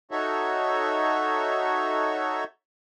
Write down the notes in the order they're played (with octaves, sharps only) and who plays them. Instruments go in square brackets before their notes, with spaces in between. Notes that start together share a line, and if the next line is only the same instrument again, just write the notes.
[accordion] D#4 F#4 A4 C#5 E5